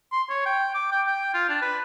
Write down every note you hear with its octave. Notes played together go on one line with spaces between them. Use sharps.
C6
C#5
G5
D6
G5
G5
F4
D4
B4